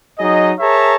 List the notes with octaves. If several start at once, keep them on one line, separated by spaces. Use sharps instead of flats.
F#3 D#4 G#4 D#5
G#4 A#4 C#5 E5 A5 A#5